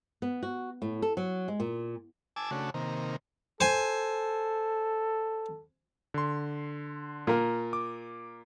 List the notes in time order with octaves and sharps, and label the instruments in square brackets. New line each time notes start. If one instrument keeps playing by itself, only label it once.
[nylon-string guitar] B3
F#4
A2
A4
F#3
G#3
A#2
[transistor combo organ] G#5 A5 D6 E6
C#3 A3 D4 F#4
C3 D#3 A#3
[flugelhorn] A4 [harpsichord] C5 G#5
[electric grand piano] D3 C6
[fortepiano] A#2 A#4
[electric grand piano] D6